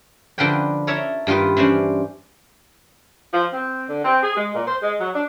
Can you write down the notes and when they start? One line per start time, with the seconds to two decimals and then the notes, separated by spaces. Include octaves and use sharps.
0.38 D3 F3 A#4 B4 G5
0.87 A4 A#4 C#5 E5 A#5
1.27 G2 D#3 F4 A#4 B4
1.57 E3 C#4 D4 C5
3.34 F3
3.53 C4
3.89 D3
4.05 C4
4.22 G#4
4.37 G#3
4.55 A#2
4.68 C5
4.83 G#3
5.00 F#3
5.15 D4